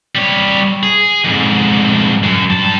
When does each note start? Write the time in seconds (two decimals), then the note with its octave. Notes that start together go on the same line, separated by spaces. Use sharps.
0.15 G3 C#5
0.83 G#4
1.25 F2 G#2
2.23 F#2
2.50 G2 A5